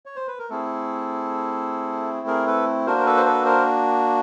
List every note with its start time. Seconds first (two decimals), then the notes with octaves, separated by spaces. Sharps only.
0.06 C#5
0.16 C5
0.27 B4
0.39 A#4
0.50 A3 C4 E4 G#4 A4
2.27 G#4 A#4
2.47 A4 B4
2.86 A#3 D4 F#4 A#4 C5
2.99 A#4
3.06 A4 B4
3.17 C5
3.25 A4 B4
3.45 A#4 C5